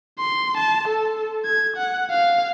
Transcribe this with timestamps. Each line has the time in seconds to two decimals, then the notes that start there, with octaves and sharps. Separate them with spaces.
0.19 C6
0.57 A5
0.88 A4
1.45 G#6
1.76 F#5
2.10 F5